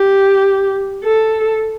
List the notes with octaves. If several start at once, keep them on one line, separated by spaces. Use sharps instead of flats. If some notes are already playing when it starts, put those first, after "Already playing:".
Already playing: G4
A4